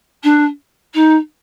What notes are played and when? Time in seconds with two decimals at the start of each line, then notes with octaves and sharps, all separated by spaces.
0.23 D4
0.94 D#4